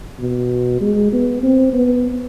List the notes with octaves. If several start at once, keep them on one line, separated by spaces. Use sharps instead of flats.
B2
G#3
B3
C4
B3